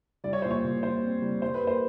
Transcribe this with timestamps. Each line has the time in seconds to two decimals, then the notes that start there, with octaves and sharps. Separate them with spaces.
0.24 G3 D5
0.33 C#5
0.42 A#2 C5
0.51 C#5
0.64 A#2
0.83 A#2 C5
1.03 C4
1.22 G3
1.42 G3 C5
1.54 B4
1.61 A#3
1.67 C5